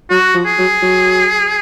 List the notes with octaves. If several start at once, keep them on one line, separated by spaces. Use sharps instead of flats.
F#3 F#4
F3
G#4
F#3
F#3